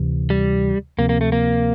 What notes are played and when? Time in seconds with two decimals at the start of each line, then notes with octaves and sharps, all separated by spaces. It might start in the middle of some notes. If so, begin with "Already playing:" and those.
Already playing: D2 C3 E3
0.30 G3
0.98 D2 C3 F3 A#3 C4
1.09 A#3
1.21 A3
1.32 A#3